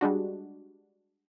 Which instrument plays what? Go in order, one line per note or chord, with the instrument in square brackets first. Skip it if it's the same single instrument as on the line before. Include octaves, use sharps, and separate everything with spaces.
[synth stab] G3 G#3 D4 F#4